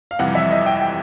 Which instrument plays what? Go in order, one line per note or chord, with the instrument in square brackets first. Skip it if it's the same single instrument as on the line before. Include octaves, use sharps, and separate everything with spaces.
[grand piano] F5
[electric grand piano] F2 C3 E3 G3 [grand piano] F#5
[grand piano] E5
D#5
G5
G5